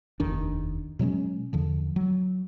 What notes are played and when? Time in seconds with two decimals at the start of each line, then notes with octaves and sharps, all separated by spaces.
0.20 F1 D#2 D#3 D4
0.99 B2 F#3 G#3 C#4
1.53 E2 D3 F3
1.96 F#3